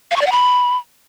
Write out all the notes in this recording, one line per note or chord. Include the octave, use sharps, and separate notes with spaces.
F5
C#6
D5
F#5
B5